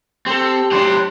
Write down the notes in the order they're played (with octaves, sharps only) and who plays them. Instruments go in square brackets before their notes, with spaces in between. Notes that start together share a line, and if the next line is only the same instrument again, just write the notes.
[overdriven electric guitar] C4 [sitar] G4 A4
[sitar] G#2 F#3 D4 [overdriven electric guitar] G4 C5